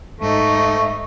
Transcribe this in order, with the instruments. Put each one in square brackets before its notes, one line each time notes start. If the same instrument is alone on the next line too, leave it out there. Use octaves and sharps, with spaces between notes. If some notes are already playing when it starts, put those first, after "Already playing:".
[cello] G#2 D#4 [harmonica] A3 [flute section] E5 F5 C#6